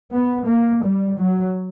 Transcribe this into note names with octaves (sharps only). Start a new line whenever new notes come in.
B3
A#3
G3
F#3